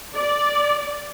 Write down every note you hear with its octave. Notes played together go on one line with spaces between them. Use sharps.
D5